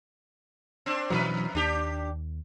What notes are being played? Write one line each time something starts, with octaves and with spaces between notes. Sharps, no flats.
C4 D4
F2 B2 E3 F#3 F#4 B4
D#2 D4 G4